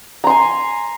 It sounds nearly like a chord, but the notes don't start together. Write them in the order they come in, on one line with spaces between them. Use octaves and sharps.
A#5 C6 G#5